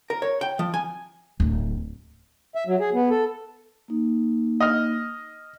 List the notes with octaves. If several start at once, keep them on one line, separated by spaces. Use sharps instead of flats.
A#4
C#5
G5
F3
G#5
D1
E5
F#3
G#4
B3
A4
A#3 D#4
D#5 F6